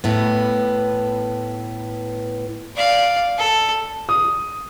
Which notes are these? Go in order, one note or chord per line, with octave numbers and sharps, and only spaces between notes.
A2 B3
D5 F5
A4
D#6